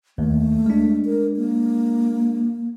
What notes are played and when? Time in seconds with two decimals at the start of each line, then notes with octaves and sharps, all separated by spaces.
0.18 D#2 A3
0.66 G#3 D4
1.05 A#4
1.37 A#3